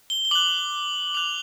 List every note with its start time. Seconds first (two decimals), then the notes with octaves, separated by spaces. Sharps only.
0.10 G7
0.25 G7
0.31 D6 F#6 F#7
1.14 D6 F#6 F7